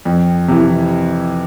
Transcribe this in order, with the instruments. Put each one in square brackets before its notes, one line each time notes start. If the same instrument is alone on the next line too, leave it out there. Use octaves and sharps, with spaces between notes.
[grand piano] F2
C3 E3